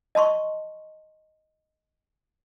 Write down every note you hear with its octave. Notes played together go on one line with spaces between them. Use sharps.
D#5 A5 C6 C#6